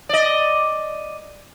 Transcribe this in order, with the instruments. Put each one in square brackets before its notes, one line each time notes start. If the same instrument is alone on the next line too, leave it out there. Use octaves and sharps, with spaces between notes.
[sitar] D5 D#5